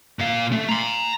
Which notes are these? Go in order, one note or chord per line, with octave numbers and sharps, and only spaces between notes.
A#2 F5
A3
A#5 C6